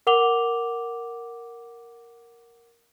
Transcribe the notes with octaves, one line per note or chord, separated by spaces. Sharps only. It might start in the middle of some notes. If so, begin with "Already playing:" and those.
A#4 F#5 D6 F7 G7